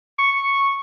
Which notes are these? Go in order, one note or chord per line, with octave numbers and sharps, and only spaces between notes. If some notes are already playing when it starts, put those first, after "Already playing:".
C#6